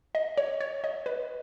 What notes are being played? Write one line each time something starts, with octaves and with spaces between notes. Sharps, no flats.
D#5
C#5
C#5
D#5
B4